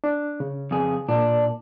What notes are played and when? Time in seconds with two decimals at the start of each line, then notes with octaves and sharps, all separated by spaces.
0.04 D4
0.40 C#3
0.71 F2 G#4
1.09 A#2 D4